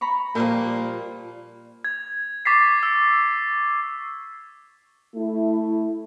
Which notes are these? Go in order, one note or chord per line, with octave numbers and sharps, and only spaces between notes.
A#5 B5 C#6
A#2 F3 G3 A#3
G#6
C#6 D6 A6 B6 C7
E6
A3 E4